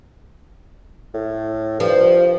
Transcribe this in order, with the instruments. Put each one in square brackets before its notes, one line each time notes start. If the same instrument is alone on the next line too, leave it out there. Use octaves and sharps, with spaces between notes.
[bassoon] A2
[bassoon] G2 [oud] F3